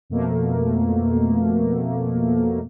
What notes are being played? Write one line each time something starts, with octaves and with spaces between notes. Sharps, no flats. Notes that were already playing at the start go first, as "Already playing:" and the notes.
F2 B2 A3 A#3